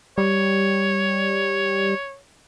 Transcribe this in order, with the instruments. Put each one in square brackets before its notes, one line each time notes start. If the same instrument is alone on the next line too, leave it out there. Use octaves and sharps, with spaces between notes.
[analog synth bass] G3 [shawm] C#5